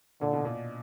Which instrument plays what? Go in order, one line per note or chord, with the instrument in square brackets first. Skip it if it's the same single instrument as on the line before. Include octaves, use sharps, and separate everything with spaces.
[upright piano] A#2 [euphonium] D3
[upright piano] B2
A#2